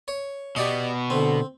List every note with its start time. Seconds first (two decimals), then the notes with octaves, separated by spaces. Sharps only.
0.08 C#5
0.56 B2 B3 G4 D5 D#5
1.10 D3 C4